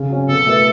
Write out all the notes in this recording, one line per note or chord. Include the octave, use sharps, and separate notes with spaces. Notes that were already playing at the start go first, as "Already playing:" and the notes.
Already playing: C#3
F#3 C#4
B2 A4
A3 E4 B4